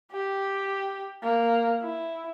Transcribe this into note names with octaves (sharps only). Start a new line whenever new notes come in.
G4
A#3
E4